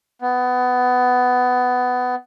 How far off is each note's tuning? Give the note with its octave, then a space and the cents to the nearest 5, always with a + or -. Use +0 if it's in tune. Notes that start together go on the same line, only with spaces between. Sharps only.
B3 +15